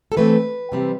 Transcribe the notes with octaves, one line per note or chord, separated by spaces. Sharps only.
A4
E3 A3 C4 B4
C3 E3 G3 C4